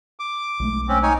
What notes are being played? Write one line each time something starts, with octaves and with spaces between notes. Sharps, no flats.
D6
B1 G#3 A3
C4 C#4
D#4 C#5 G#5